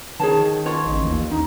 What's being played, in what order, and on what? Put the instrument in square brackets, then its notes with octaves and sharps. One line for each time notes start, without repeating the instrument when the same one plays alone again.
[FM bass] D#3 [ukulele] G#4 C#5 A5
[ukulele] F4 C#5 D#5
[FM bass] A1
D#2
[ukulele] D#4